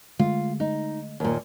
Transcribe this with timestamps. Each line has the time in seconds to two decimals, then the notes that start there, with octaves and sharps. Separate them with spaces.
0.19 D3 G#3 A3 F4
0.60 D#4
1.20 D#2 A#2